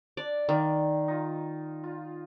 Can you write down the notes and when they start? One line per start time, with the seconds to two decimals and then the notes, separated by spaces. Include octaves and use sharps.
0.17 D4 D5
0.49 D#3 D5 F5 G5
1.08 D#4 F4
1.84 F4